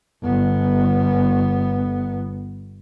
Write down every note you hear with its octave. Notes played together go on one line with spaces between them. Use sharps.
G1 B3